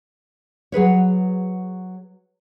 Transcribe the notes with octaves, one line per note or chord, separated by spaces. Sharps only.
F#3 G#4 B4 C#5